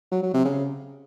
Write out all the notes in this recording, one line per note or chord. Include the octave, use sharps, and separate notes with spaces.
F#3
F#3
C3
C#3